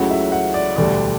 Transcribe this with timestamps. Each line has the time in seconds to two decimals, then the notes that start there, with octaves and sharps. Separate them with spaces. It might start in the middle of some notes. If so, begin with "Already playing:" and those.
Already playing: C#2 C#3 F#3 A3 E4 F#5
0.10 E5
0.32 F#5
0.54 D5
0.76 E1 D2 D3 G3 D5